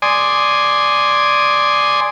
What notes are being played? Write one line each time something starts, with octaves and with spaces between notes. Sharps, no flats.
D5 G#5 C6 D#6